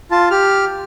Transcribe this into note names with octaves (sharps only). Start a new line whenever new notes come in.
F4 A5
G4 F6